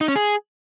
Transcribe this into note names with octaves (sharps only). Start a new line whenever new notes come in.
D#4
C#4
G#4